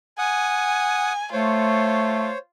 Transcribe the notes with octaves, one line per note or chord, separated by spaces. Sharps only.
F#5 G#5 D#6
A3 F4 C5 C#5